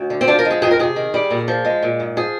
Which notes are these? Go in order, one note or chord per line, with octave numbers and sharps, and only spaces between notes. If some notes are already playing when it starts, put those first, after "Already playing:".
Already playing: D2
D3
C4
F3 D4
A#4
G#3
G#4
F2 G#4
A#4
C3 G#4
D#3
G3
A#2
F3
G#3
A#2
G#2
F3 G#4